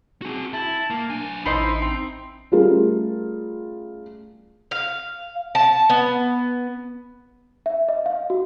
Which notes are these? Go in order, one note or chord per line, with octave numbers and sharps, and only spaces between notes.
C4 F#4 G#4
E4 A5
A#3
B1 D4 G#5
A1 D#4 E4 C5 D#5
C4
G3 A3 C#4 F4 G#4 A#4
F5
A5
B3
E5
D#5
F5
F#4